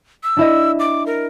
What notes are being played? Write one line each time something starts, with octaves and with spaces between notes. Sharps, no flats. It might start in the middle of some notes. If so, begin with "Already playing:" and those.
E6
D4 E4 D#5
D6
A#4